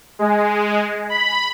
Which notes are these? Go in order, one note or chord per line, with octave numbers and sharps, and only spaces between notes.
G#3
B5